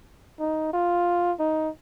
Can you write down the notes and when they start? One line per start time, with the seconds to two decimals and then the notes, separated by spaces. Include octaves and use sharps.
0.40 D#4
0.74 F4
1.39 D#4